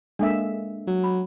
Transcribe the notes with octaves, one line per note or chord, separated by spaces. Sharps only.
G#3 A#3 D4 A4 E5
F#3
B5